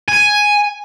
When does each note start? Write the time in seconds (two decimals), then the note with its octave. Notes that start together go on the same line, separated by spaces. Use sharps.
0.08 G#5